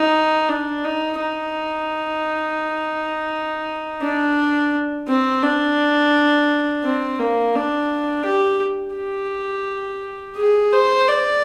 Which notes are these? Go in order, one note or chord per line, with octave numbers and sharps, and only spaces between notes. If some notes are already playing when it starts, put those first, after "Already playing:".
Already playing: D#4
D4
D#4
D#4
D4
C4
D4
C4
A#3
D4
G4
G4
G#4
C5
D5